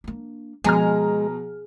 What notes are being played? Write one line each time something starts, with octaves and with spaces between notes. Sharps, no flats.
A#3 D4
B2 F3 G#3 G#4 A#5 F6